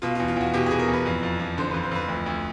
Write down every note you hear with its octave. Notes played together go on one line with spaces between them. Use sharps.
B2 F4
F4
E2
F4
E2 F#4
B2 G4
G#4
B2
A#4
E2
B4
F2
F2
F3
D3 C5
F2 B4
C5
F2 B4
D2
D2